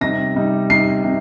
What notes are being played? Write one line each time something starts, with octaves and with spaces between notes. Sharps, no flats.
C3 G3 D#4 A#6
C3 G3 D#4
C3 G3 D#4 C7
C3